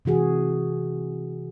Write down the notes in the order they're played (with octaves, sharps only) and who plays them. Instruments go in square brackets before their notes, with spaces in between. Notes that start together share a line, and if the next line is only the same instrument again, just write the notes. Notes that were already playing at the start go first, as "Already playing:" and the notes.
[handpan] C3 E3 F#4 G#4